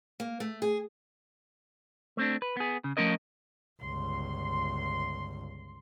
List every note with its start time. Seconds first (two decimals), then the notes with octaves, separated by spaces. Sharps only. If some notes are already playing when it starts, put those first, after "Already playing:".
0.20 A#3
0.40 A3
0.62 G#4
2.17 A3 C4 D4
2.42 B4
2.57 B3 G#4
2.84 C#3
2.97 F3 A3 C#4 A#4 D#5
3.82 G1 C#2 C6